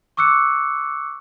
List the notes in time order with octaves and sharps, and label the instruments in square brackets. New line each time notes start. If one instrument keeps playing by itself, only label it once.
[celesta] C#6 D6 E6 F#6 C#7